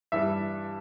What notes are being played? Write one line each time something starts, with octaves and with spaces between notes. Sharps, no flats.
G2 E3 G3 E5